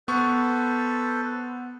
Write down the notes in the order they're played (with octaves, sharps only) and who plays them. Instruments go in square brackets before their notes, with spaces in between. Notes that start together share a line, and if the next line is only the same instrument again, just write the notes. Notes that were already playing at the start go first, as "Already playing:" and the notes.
[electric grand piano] B3 C#6 [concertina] A4 B4 C5